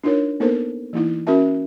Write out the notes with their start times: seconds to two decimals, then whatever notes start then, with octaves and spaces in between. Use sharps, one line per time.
0.04 D4 D#4 F4 A#4 C#5
0.40 A#3 B3 D#4 A4 A#4 C5
0.93 E3 A#3 D#4 E4
1.27 C#4 F#4 A#4 E5 A5